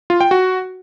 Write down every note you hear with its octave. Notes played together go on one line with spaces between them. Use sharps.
F4
G5
F#4